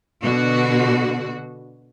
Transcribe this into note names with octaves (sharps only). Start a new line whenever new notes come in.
B2 D3 F#4